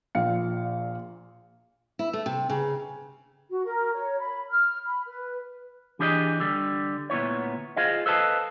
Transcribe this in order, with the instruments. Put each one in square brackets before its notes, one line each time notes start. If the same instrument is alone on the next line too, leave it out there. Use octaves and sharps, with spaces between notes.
[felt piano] A#1 A#2 F5 C#7
[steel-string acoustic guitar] E4
A3
C3
C#3
[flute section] F#4
A#4
C#5
B5
F6
B5
B4
[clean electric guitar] E3 D4 G4 G#4 D5 D#5
D3 G3
D2 A#2 B3 E4 C#5
F4 G#4 C5 D#5 F5
A4 B4 C5 D#5 F5 A5